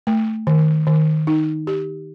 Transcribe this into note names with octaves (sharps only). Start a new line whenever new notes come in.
A3
D#3
D#3
D#4
G4